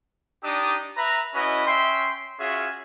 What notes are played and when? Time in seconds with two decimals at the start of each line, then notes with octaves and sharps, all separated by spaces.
0.43 D4 D#4 G4 D#6
0.96 B4 E5 A#5
1.34 C#4 E4 F#4 B4 D#5
1.66 C#4 E5 G5 C6
2.39 C#4 F4 F#4 G#4 E5